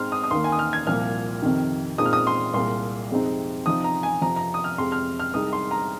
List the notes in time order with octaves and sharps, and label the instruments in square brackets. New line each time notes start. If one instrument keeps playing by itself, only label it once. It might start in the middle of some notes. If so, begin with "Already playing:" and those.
Already playing: [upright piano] G#2 G#3 C4 D#4 C6 F6
D#6
D#6
D#2 D#3 A#3 C6
G#5
D#6
F6
G#6
C2 A#2 F3 F6
F2 C3 D#3
A#2 G#3 C4 D#4 D#6
F6
D#6
C6
C2 A#2 G#3 C6
F2 C3 G#3 C4 D#4
C3 F3 C4 D#4 D#6
A#5
G#5
F2 C3 F3 A#5
A#5
D#6
F6
F2 C3 G#3 C6
F6
F6
C2 C3 G#3 D#4 D#6
C6
A#5